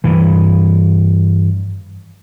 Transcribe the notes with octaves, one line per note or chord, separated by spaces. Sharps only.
G2 E3